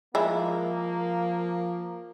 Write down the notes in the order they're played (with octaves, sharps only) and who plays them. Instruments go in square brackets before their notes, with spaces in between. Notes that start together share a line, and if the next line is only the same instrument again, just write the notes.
[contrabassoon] F3 [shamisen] G#3 E4 [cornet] A#3